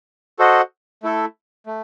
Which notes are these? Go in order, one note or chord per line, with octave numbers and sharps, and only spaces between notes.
F#4 A4 C5 D#5 F#5
A3 E4 A4
A3